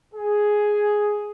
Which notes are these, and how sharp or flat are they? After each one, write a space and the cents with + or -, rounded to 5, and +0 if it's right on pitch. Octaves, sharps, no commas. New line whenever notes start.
G#4 +5